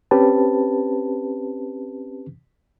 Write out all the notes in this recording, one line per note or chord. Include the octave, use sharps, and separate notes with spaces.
C4 C#4 G4 B4 A5